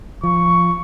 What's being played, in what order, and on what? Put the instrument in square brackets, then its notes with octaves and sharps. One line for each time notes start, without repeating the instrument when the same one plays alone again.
[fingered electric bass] F3 [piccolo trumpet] C#6